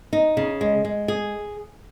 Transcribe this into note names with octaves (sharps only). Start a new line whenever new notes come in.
D#4
C#3
G#3
G#3
G#4